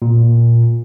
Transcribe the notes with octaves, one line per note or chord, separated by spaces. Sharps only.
A#2